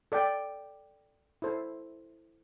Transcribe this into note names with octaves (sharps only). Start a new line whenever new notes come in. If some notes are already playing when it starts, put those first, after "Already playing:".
A4 D5 G5
E4 A4 C5